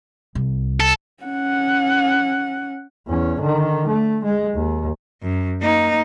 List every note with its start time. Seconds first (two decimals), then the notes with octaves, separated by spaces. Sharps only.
0.35 C2
0.80 A4
1.23 C#4 F#5
3.08 E2 C#4
3.40 D3 D#3
3.88 A3
4.25 G#3
4.56 D#2
5.22 F#2
5.61 A#3 D#4